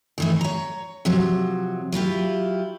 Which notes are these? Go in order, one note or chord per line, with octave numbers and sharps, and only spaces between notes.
D#3 E3 A3
C#5 A#5
C3 F3 F#3
F#3 E4 F4 G4